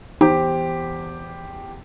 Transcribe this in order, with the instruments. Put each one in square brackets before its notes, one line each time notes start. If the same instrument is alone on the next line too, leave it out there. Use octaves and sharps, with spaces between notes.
[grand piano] E2 G4 C5 [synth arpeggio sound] D#4